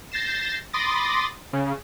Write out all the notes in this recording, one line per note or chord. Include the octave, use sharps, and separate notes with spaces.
G6 A6 A#6 C7 E7
B5 C6 D6 D#6 A6 A#6
C#3